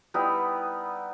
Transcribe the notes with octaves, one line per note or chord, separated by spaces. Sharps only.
G3 B3 D#4 E4